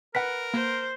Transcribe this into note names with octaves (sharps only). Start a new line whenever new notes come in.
A#4 B4 F#5 B6
A#3 C5